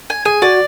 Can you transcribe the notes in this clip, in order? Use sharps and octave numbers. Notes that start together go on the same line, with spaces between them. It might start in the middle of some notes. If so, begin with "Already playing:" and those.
G#5
G#4 G#5
F#4 D5